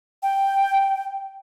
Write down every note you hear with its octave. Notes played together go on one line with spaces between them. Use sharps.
G5